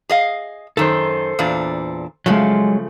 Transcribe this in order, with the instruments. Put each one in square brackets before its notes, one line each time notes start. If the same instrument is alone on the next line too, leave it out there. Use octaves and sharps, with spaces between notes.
[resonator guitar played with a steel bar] G#4 D#5 F5
[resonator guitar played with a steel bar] F#2 D#3 [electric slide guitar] A4 C5
[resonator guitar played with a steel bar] E2 A#2 D4
[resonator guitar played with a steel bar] C#3 F3 A3 [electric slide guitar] F#3 G#3